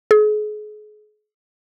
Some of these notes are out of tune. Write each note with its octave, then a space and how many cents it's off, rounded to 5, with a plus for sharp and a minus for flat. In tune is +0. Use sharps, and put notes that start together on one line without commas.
G#4 +35